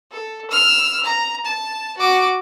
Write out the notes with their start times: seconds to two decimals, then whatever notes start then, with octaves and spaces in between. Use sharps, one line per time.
0.12 A4
0.51 E6 F6
1.04 A#5
1.45 A5
1.97 F#4 D6